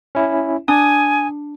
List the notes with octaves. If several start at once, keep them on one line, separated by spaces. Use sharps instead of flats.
C#4 E4
D4 G#5 D#6